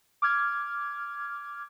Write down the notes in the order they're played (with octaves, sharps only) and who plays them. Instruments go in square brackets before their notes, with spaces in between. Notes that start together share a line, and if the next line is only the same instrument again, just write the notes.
[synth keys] D6 F6 G#6